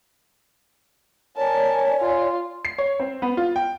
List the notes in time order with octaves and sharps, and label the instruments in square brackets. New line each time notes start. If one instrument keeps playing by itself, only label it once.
[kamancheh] A#4 A5 [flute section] C#5 D5 G#5
[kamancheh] F4
[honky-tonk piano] C7
C#5
C4
B3
F4
G5